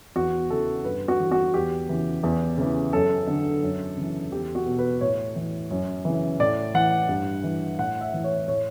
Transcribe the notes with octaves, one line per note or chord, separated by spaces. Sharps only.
E2 F#4
C#3 E3 A4
G2 B4
F#4
E3
F#4
E2 G4
C#3 E3
E2
C#3 E3
F#2 A4
D3
F#2
C#3 E3
E2 G4
F#4
B2
B4
A2 C#5
E3
F#2
C#3 E3
A2 D5
E3 F#5
G2
E3
A2 F#5
E5
E3
C#5
A2 C#5